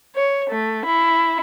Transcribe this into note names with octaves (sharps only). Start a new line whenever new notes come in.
C#5
A3
E4